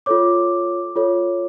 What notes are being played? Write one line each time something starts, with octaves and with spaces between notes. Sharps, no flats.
F4 A4 C#5 D6
F4 A4 C#5